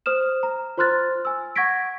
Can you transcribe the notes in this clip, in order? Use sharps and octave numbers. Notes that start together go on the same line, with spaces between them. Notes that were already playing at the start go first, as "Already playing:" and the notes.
C5 D#6 F6 E7
A#5
F4 C5 C6 F6 F#6 A6
G#5 E6
F#5 C#6 G#6 A#6 B6 D7